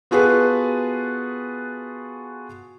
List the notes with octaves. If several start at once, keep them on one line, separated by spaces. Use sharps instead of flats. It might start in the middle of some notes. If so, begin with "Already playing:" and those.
B3 F4 F#4 G#4 A4 B4